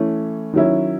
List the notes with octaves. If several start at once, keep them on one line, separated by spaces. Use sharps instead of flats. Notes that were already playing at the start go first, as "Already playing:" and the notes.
Already playing: E3 A3 C#4
D#3 F#3 C#4 E4